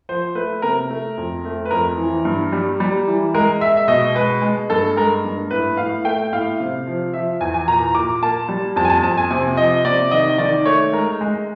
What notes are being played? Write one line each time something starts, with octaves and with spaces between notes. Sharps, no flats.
F3 C5
A3 B4
C3 A#4
A3
F2
A3
B4
F2 A#4
E3
G2
G3
G3
E3
G#3 A#4
G#3 E5
E5
B2 D#5
G#3 B4
G#3
G2 A4
G#3 A#4
G2
A2 B4
A2 F5
A3 G5
A2 F5
C3
F3
F3 E5
E2 G#5
G#5
A#2 A#5
A#2 D6
A#3 A5
G3
F2 A5
G#5
A5
F2 A5
G#5
C3 G#5
F3 D#5
C3 D5
D#3 D#5
D#3 D5
A3 C#5
G#3 A#4
G#3